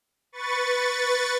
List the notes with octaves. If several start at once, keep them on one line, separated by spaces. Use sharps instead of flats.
B4 C#6 A6